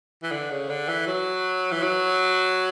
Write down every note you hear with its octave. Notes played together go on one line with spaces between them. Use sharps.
E3
D3
C#3
D3
E3
F#3
E3
F#3